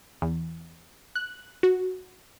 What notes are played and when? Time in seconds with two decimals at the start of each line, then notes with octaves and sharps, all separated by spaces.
0.22 E2
1.16 F#6
1.63 F#4